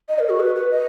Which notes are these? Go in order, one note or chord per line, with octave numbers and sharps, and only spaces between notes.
D#5
A#4
F#4
B4
B4
D#5